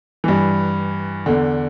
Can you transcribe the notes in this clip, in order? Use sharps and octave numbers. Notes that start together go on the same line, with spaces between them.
G2 E3
E2 D3